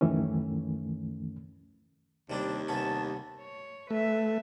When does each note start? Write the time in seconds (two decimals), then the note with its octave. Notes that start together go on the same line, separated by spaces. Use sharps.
0.01 C#2 F#2 D#3 E3 A3 C#4
2.30 D#2 C3 G3 C4 D4
2.68 C2 B3 C#4 A5
3.40 C#5
3.90 A3 B4 E5